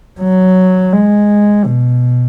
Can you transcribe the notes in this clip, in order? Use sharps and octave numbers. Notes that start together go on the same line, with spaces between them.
F#3
G#3
B2